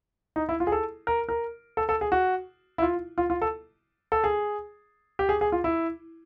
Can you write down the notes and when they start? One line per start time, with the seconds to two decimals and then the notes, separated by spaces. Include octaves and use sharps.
0.36 D#4
0.49 E4
0.60 F4
0.67 G#4
0.72 A4
1.07 A#4
1.29 A#4
1.77 A4
1.89 A4
2.01 G#4
2.12 F#4
2.78 E4
2.82 F4
3.18 F4
3.30 F4
3.42 A4
4.12 A4
4.24 G#4
5.19 G4
5.29 G#4
5.41 G#4
5.52 F4
5.64 E4